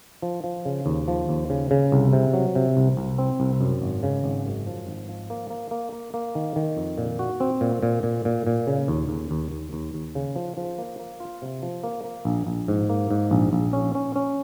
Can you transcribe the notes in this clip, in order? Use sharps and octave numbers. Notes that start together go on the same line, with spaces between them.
F3
F3
C#3
D#2
F3
D#2
C#3
C#3
C2
C3
F#3
C3
C2
C2
C4
C2
F#2
G#1
C#3
G#1
F#2
F3
G#1
F3
A#3
A#3
A#3
A#3
A#3
D#3
D#3
F2
A#2
F#4
C4
A#2
A#2
A#2
A#2
A#2
C#3
D#2
D#2
D#2
D#2
D#2
D#2
C#3
F3
F3
A#3
A#3
F4
C3
F3
A#3
A#3
A#1
A#1
G#2
A#3
G#2
A#1
A#1
C#4
C#4
C#4